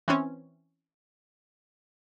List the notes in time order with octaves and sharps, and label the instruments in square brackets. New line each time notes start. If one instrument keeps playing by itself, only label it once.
[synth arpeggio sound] E3 C4 C#4